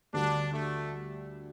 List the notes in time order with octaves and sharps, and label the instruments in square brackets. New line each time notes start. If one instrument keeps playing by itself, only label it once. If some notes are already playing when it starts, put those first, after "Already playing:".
[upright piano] D2 D3 G3 [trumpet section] D4
[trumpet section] A3